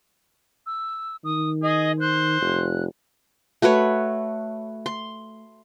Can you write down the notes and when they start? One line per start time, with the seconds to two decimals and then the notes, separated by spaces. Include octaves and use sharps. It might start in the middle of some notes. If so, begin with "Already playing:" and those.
0.66 E6
1.24 D#3 D#6
1.63 G#4 D#5
2.00 C5 F#6
2.42 F1
3.62 A3 F#4 B4 C#5
4.86 C6